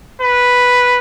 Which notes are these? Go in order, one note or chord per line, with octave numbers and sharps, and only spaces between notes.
B4